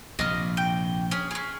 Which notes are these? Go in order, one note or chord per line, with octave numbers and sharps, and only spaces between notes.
A#1 C3 D#5 F6
G5
C#4 G#4
C#4 G#4